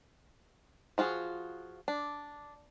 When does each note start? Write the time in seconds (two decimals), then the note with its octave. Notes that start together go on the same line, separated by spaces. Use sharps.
0.98 F3 F4 F#4 G#4
1.88 D4